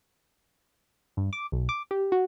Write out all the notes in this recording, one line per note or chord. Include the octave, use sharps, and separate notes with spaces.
G2
D6
B1
D6
G4
F#4